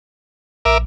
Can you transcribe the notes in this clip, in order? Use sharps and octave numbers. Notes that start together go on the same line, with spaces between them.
A#1 A#4 E5 D6